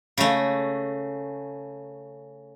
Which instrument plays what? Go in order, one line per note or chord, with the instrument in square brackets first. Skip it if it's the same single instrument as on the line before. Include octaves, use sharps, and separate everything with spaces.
[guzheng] C#3 A3